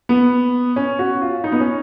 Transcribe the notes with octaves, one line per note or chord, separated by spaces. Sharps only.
B3
C#4
F#4
F4
D#4
B3
C#4